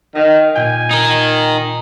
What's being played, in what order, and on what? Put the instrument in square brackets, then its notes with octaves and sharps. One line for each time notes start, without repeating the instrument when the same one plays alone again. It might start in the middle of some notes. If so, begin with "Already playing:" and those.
[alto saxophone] D#3 [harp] D#5 F5
[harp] A#2 G5 [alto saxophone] G#5
[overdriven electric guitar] D#4 A#4